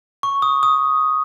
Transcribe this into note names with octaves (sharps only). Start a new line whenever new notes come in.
C#6
D#6
D#6